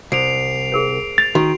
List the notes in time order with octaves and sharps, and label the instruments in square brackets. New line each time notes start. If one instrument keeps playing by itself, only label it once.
[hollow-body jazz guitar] C2 [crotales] C7 D7 F7
[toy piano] G#4 A#4 C5
[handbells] A6 [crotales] F7
[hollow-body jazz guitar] D#3 [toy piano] F#4